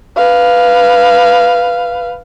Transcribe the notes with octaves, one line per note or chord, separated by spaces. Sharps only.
B4 F5